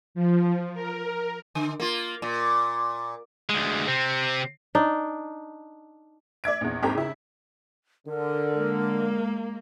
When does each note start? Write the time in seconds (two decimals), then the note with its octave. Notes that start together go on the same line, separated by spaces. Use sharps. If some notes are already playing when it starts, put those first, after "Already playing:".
0.15 F3
0.73 A#4
1.55 D3
1.80 A#3 F4
2.22 A#2
3.49 D2 G#3
3.88 C3 C4
4.75 D4 D#4
6.44 D5 E5 G#6 D7
6.61 A#1 E2
6.83 G#1 C4 G4 A4 G5 A#5
6.95 C#3 E4
8.07 D3 A#4
8.56 G#3 A#3